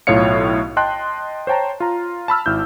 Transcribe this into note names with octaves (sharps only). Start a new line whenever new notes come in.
B1 A2 F4 C#5 F5 C#7
D#5 G5 A5 C6 F#6
C5 C#5 G5 A5 A#5
F4 A#5
A5 B5 E6 F6
G#1 E4 G6